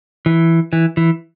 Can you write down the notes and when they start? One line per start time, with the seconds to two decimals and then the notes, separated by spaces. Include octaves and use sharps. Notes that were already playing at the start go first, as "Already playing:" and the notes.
0.26 E3
0.73 E3
0.97 E3